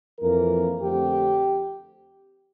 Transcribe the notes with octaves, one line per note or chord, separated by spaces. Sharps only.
F2 E3 A#3 A#4
F2 D3 A3 C4 G4